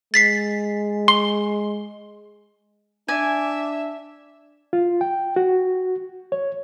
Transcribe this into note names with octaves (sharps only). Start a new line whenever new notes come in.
G#3 A6 B6 C7
C6 G7
D4 D5 E5 G#5
F4
G5
F#4
C#5